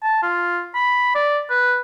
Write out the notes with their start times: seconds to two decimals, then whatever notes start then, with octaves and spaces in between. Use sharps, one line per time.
0.03 A5
0.22 F4
0.75 B5
1.15 D5
1.50 B4